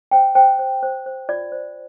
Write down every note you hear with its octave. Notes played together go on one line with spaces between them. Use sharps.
C5 G5
C5 G5
C5
C5
C5
F4 D5
C5